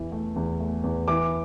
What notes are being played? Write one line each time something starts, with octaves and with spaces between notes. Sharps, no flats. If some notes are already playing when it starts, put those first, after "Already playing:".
Already playing: E2 E3
A3
E2
A3
E2
E3 D6